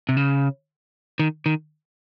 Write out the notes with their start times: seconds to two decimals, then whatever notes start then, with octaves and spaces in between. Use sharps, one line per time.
0.09 C3
0.17 C#3
1.19 D#3
1.46 D#3